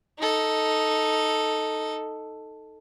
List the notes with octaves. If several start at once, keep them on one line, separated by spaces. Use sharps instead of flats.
D#4 A4